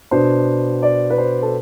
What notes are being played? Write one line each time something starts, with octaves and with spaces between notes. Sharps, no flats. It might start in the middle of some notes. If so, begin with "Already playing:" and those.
B2 B3 D4 C5
D5
B4
C5
A4